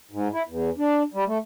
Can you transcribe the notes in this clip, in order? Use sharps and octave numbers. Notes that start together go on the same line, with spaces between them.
G#2
E4
E2
D4
G3
A3